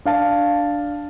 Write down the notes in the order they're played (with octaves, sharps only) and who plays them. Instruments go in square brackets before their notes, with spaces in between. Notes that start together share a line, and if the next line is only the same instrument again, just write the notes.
[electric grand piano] D4 F5 A5